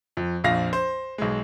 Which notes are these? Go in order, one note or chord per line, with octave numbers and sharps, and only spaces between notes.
F2
A#1 F2 F5 A#6
C5
B1 G#3